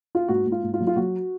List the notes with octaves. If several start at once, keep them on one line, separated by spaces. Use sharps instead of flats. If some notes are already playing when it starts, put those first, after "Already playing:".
F4
G#2 F#4
G#2
F4
G#2
F4
F#3
F4
F#3 F#4